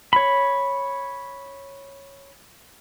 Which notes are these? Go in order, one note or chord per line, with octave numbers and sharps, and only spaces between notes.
C#5 B5